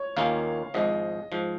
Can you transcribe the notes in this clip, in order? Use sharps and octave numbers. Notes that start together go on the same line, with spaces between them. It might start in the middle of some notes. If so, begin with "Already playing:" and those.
Already playing: C#5
D#2 D#3 A#3 C#4 F4 F5
G#1 G#2 F3 D#5
G#2 F3